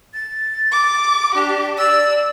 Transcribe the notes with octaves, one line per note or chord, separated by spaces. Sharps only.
A6
D6
D4 G4
D5 E6